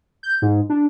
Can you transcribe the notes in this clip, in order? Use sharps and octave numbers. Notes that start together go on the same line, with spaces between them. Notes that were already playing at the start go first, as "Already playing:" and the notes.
G6
G#2
D4